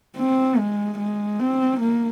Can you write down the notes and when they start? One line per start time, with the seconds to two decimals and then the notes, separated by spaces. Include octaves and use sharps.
0.17 C4
0.58 G#3
0.99 G#3
1.40 C4
1.80 A#3